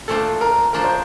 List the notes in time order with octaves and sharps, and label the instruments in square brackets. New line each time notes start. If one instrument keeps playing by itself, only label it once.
[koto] A#2 F3 A3 D4 F4 [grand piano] A4
[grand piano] A#4
[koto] A#2 F3 A3 D4 F4 [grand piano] A#4
[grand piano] C5